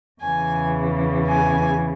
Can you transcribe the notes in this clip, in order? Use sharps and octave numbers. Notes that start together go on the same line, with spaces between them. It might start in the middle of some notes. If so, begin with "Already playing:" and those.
E2 C#3 E3 G#5
G#5